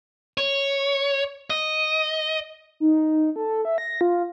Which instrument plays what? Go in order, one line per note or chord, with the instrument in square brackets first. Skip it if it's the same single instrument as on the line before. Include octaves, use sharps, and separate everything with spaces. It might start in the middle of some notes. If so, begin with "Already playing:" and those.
[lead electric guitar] C#5
D#5
[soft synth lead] D#4
A4
E5
A#6
F4